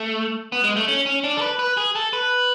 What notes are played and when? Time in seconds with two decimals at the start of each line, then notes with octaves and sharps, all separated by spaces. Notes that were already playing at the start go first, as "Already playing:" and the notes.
Already playing: A3
0.52 B3
0.64 G#3
0.76 A3
0.88 C#4
1.06 C#4
1.24 D4
1.37 A4
1.41 B4
1.59 B4
1.77 G#4
1.95 A4
2.13 B4